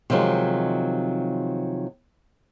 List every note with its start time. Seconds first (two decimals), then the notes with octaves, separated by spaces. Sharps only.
0.10 C3 D#3 F3 F#3 G#3